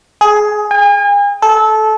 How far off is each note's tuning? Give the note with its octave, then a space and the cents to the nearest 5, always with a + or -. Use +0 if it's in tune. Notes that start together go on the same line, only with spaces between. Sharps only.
G#4 +15
G#5 -40
A4 -20